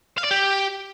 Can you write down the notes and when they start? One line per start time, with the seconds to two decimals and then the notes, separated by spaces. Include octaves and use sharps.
0.18 F5
0.24 D5
0.31 G4